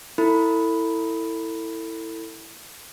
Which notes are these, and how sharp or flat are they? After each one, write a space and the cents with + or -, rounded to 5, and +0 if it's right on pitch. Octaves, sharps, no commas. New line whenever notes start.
E4 +0 A4 +30 B5 +0